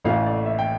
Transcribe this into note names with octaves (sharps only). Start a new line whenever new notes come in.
A1 A2 E3 F5
D5
E5
G5